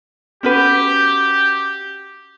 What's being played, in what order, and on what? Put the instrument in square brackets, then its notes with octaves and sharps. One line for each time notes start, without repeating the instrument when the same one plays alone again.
[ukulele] C#4 F#4 B4 [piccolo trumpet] G4